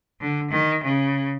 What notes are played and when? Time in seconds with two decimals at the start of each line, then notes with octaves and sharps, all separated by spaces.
0.21 D3
0.51 D#3
0.84 C#3